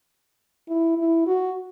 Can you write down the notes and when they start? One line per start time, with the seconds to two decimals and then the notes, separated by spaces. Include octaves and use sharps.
0.68 E4
0.98 E4
1.27 F#4